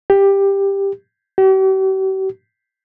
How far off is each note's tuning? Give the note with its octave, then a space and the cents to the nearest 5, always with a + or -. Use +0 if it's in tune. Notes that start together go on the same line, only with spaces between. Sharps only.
G4 +10
G4 -45